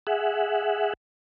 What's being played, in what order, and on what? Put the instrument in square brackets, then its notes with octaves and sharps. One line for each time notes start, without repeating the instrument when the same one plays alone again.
[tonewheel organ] G#4 E5 F#5